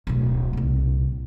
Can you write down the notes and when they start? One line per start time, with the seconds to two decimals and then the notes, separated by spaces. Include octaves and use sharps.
0.07 D1 B1
0.53 C2 A#2